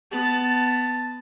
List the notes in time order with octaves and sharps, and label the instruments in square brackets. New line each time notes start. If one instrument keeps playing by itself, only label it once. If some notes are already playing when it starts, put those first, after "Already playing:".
[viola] B3 A5